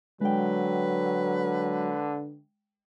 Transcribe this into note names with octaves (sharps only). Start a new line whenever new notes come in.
D3 F#3 G#3 B4 G5